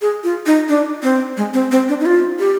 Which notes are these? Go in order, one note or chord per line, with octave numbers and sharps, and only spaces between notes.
G#4
F4
D#4
D4
C4
G#3
C4
C4
D4
D#4
F4
G4